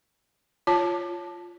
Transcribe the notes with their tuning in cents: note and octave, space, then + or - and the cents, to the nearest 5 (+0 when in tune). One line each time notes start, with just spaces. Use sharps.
F4 -5 C#5 +0 A5 +0